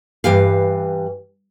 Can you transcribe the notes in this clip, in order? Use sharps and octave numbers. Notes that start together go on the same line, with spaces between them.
G2 E3 G4 F5